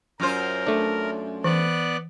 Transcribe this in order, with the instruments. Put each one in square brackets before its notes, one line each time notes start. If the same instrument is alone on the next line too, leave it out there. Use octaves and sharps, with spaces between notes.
[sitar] F#2 F4 C5 [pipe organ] A#4
[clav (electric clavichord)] A3 D4
[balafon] E3 [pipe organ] B3 D5 F#6